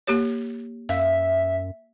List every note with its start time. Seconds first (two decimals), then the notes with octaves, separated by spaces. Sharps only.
0.07 A#3 G4 C#5
0.89 F#2 E5 F5